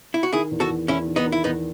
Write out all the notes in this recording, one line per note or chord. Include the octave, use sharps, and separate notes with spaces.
E4
F#4
D#3 E4 G#4
E2
F#4 A4
E2
E2 C#4 E4
D#3
B3 D#4
D#3
E4
E2 B3 D#4